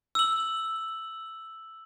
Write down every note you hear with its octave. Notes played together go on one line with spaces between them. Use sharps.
E6 F#7